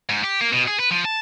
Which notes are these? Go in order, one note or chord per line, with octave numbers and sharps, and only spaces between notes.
G#2
G4
A#3
B2
G#4
B4
F3
A5